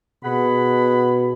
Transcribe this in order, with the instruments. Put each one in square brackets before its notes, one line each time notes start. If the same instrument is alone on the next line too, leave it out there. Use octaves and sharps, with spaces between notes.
[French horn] B2 [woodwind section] G#4 F#5 B5